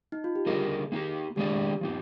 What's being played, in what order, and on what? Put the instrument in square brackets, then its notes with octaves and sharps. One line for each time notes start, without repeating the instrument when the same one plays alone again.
[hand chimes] D#4
F4
G4
[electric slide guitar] D3 G3 A#3 D#4 A#4 [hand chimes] G#4
[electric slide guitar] A#3 D#4 G4
[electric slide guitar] D#3 G#3 D4 G#4 D5 [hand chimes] G4
[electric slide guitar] F3 A#3 D#4